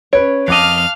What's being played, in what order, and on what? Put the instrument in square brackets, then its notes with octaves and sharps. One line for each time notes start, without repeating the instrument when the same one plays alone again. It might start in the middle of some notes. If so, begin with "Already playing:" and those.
[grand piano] C#4 B4 D7 [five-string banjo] C#5
[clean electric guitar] F2 D#5 [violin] F5 F6 [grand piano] A5 D6 F#6